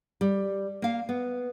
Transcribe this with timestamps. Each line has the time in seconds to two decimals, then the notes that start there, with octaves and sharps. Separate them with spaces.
0.21 G3
0.82 A#3 F5
1.09 B3